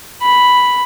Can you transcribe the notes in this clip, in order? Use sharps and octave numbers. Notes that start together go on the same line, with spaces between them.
B5